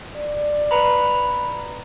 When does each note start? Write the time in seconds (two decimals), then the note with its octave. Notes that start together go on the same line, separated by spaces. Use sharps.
0.17 D5
0.71 B4 A#5 B5